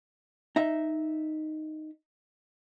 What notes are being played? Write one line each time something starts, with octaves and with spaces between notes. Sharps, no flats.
D#4 E5